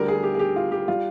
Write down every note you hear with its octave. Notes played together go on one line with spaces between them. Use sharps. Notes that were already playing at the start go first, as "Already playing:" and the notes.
Already playing: D2 D3 G3 A#4
G#4
G4
G#4
G4
F4
G4
G3 F4